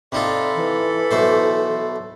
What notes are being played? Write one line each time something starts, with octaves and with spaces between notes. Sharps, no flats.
C3 D#4 F4 A4 D5 B5
E3
B1 A3 C5